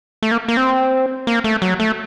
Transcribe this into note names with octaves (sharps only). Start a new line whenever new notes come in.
A3
A#3
A#3
C4
A#3
A3
F#3
A3